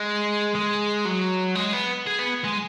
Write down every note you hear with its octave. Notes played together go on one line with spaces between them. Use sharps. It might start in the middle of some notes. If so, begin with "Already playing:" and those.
Already playing: G#3
G#3
F#3
G#3
B3
G#4
B3
G#3